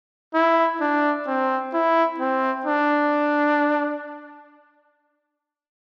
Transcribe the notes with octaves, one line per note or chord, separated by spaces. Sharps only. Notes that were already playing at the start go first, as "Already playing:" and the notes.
E4
D4
C4
E4
C4
D4